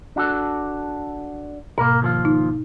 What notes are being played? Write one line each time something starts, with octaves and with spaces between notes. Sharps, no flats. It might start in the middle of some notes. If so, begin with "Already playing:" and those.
D4 F#4 A4
G#2 B2 A#3 A#4
D#2 F3 F4
D#4